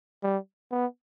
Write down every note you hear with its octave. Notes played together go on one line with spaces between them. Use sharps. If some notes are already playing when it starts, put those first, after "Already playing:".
G3
B3